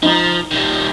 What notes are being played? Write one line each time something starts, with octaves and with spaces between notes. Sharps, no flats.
F3 D#4
D#3 G3